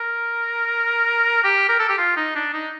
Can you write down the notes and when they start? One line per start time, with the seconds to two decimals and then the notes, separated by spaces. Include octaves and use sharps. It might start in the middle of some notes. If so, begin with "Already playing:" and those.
Already playing: A#4
1.44 G4
1.69 A#4
1.79 A4
1.89 G4
1.98 F4
2.17 D#4
2.35 D4
2.53 D#4